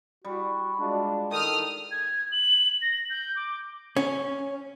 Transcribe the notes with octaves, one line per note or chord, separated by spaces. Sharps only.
G3 F#4
G#3 D4 F4
D#3 A4 D#6 F6
G#6
F#7
A#6
G6
D6
C#4